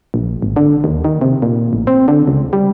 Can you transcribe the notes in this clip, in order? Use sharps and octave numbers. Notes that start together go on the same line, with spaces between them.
A#1
G#1
D3
D#2
D#3
C3
A#2
A1
C4
D3
C#2
G3